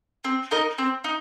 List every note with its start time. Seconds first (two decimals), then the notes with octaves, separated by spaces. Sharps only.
0.25 C4
0.51 D#4 A#4 D#5
0.78 C4
1.04 D#4